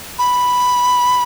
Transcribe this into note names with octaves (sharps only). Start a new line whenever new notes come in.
B5